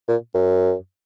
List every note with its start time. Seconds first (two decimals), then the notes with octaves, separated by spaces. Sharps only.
0.08 A#2
0.35 F#2